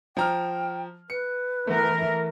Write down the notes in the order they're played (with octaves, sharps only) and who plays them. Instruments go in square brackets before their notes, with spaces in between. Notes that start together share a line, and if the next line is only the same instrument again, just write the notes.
[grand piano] F3 A#5 F6 [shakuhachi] G5
[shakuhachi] B4 [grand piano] C#7
[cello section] E3 A#4 [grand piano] A3 B3
[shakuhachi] E5